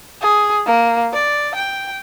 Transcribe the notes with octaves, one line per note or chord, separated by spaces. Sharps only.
G#4
A#3
D5
G5